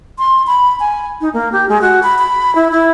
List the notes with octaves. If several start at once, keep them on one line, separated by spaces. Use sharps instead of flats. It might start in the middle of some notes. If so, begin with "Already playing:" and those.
C6
B5
G#5
D#4
A#3
G4
G#3
F#4
B5
B5
E4
E4